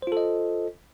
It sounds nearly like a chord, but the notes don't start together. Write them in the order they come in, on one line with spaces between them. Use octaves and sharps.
C5 F4 A4 D#5